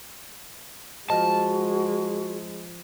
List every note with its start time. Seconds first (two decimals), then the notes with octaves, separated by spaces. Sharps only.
1.10 F3 G#3 F#4 D#5 A5